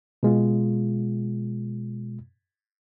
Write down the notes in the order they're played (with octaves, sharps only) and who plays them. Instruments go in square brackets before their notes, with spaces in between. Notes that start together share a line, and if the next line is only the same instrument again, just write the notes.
[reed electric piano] B2 G#3 F4